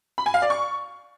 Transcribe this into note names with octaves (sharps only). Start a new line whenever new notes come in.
B5
G#5
F5
D5
C#6